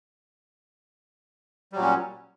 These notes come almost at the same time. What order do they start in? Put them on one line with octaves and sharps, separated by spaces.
G3 F#3 A#2 C#4